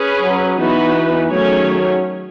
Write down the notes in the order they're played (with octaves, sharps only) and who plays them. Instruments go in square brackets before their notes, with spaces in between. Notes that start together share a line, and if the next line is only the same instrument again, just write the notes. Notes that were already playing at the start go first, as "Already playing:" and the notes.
Already playing: [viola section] C#4 G#4 B4
[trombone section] F#3
[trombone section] E3 [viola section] B3 D#4 F#4 B4
[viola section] D#3 A3 C#4 G#4 C#5 [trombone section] F#3